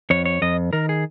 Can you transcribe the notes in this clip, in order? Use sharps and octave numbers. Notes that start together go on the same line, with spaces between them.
F2 C#5
C#5
F2 D#5
D#3 A#4
G#4